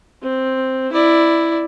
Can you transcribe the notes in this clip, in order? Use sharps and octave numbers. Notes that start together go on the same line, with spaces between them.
C4
E4 D5